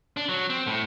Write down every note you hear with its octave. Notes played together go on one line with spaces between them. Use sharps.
D4
F#3
C4
A2